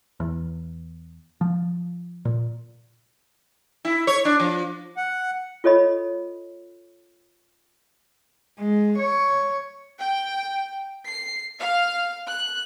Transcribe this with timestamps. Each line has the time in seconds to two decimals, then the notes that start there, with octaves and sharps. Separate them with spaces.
0.20 E2
1.41 F3
2.25 A#2
3.85 E4
4.07 C#5
4.25 D4
4.40 F3
4.97 F#5
5.64 F4 A4 C#5 D#5 B5
8.58 G#3
8.98 C#5
9.99 G5
11.07 C7
11.59 F5
12.28 F#6